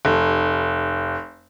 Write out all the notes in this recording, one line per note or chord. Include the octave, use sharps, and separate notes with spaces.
F1